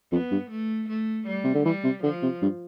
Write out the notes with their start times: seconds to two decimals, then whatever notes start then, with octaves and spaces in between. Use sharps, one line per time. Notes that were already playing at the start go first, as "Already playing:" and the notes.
0.12 F2 B3
0.31 G2
0.50 A3
0.89 A3
1.27 G3
1.44 C3
1.54 D3
1.65 E3 G3
1.84 C3
2.03 D3 F3
2.23 C3
2.42 G2